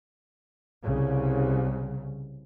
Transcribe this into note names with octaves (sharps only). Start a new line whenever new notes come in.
C2 C#3